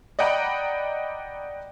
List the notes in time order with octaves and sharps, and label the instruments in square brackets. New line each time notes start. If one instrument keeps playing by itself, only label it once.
[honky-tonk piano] D5 D#5 F#5 G5 A#5 B5